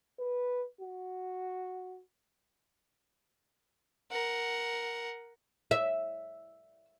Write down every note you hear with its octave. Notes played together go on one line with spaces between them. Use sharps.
B4
F#4
A#4 F#5
E5